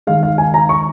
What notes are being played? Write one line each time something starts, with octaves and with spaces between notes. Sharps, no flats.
D#3 G#3 F5
F5
G#5
A#5
C#6